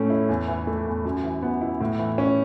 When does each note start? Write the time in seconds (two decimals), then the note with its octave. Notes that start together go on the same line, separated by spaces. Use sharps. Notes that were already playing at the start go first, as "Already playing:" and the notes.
Already playing: A2 A3 C#4
0.10 E4
0.29 E2
0.48 E3
0.67 A3
0.86 E2
1.05 F#2
1.23 E3
1.43 B3
1.61 E4
1.81 A2
1.99 E3
2.18 C#4